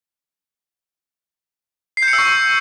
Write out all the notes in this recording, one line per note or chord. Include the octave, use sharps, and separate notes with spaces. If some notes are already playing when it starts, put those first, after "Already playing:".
C7
G6
C#7
E6
C#6